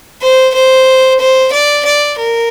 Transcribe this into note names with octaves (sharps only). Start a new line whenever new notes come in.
C5
C5
C5
D5
D5
A#4